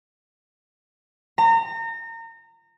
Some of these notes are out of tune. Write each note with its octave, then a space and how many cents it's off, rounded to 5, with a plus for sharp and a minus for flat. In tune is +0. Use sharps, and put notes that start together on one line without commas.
A#5 -30